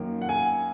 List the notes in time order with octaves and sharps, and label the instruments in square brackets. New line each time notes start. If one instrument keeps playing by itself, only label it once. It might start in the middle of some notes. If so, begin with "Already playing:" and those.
Already playing: [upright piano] F#2 D#3 A#3
F#5
G#5